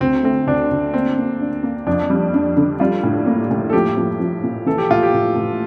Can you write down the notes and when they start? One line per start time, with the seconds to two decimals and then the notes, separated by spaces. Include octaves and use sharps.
0.01 D2 C4
0.23 A3 C4
0.47 D2 D4
0.71 D2
0.94 A#3 C4
1.18 A#3
1.41 D4
1.63 A#3
1.87 F2 D4
2.10 G3
2.34 D4
2.57 D3
2.80 G3 F4
3.03 A2
3.26 A#3
3.51 A2
3.69 A4
3.73 F3 G4
3.97 F3
4.20 F3
4.43 A#2
4.66 E3 A4
4.78 G4
4.90 A2 F4
5.03 G4
5.13 A2
5.36 A2